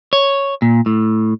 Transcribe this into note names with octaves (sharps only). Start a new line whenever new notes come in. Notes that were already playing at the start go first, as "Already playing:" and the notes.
C#5
A#2
A2